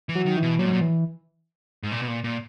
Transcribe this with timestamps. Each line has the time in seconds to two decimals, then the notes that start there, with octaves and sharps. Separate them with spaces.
0.09 E3
0.15 F#3
0.26 D#3
0.37 E3
0.43 B2
0.59 A#2 F#3
0.67 G#2
0.73 A#2
0.81 E3
1.83 G#2
1.92 A#2
2.02 B2
2.08 A#2
2.24 A#2